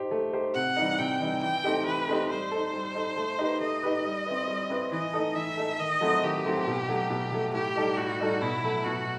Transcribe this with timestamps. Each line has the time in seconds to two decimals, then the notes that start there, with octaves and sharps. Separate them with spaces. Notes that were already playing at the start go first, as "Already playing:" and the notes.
Already playing: D#4 G4 C5
0.11 A3
0.33 D#4 G4 C5
0.54 C3 F#5
0.77 E3 G3 D#4
0.99 C3 G5
1.21 E3 G3 D#4
1.42 E3 G5
1.64 A3 C4 D#4 G4
1.86 E3 B4
2.08 A3 C4 D#4 G4
2.30 G3 C5
2.51 D#4 A4
2.73 G3
2.95 D#4 A4
3.17 A3
3.39 D#4 G4 B4
3.61 A3 D#5
3.83 D#4 G4 B4
4.04 G3
4.26 C4 E4 B4
4.48 G3
4.70 C4 E4 B4
4.92 E3 D#5
5.13 A3 D#4 A4
5.35 E3 E5
5.57 A3 D#4 A4
5.79 D#3 D#5
6.01 F#3 A3 C4 E4
6.23 D#3 G4
6.45 F#3 A3 C4 E4
6.67 B2
6.88 F#3 A3
7.10 B2
7.32 F#3 A3
7.54 A2 G4
7.76 G3 D#4 A4
7.97 A2 F#4
8.20 G3 D#4 A4
8.41 B2 E4
8.63 F#3 A3
8.85 B2 F#4